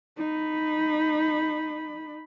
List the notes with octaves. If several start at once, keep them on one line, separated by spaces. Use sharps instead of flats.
D#4 B5